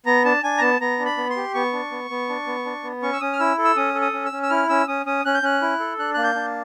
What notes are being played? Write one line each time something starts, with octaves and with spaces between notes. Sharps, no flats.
B3 A#5
D4 A5
D4 G#5
A#5
B3 A5
B3 A#5
D4
B5
B3
C6
G4
B3 C#6
D4
B3
B3
D4
B3
D4
B3
C#4 C#6
E6
C#4 D#6
F6
E4 E6
A4
E6
C#4 D#6
A4
D#6
C#4
E6
C#4
E6
E4 F6
C#4 E6
C#4 D#6
C#4 D#6
C#4 F#6
G6
C#4 F#6
E4
A4
D4 F#6
A#3 F#6
G6
D4